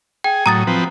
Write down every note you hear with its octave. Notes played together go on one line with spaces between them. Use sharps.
G#4 G5
A2 F#3 A#5 D#6 A6
F3 C4 B4